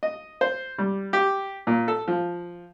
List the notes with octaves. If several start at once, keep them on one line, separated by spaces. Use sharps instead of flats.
D#5
C5
G3
G4
A#2
A4
F3